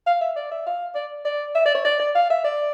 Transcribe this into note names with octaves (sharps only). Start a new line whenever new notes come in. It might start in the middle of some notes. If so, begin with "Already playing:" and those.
F5
E5
D5
E5
F5
D5
D5
E5
D5
C#5
D5
D5
F5
E5
D5